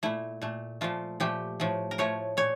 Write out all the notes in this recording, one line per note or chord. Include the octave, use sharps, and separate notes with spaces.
A#2 A3 E4
A#2 A3
A#2 F3 A3 F4
A#2 F3 A3 G4
A2 F3 A3
A#4
A2 F3 A3 C#5
A#2 C#5